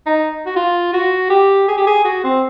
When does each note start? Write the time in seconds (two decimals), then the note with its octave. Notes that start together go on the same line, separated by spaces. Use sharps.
0.06 D#4
0.46 F#4
0.56 F4
0.93 F#4
1.30 G4
1.68 G#4
1.77 G4
1.87 G#4
2.05 F#4
2.24 C4